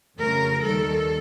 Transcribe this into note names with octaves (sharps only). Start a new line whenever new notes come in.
F2 C#3 F#3 A3 A#4
D#2 D#3 G3 A4